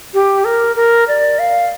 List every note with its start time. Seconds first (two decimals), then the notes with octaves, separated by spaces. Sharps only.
0.14 G4
0.45 A#4
0.76 A#4
1.08 D5
1.39 F5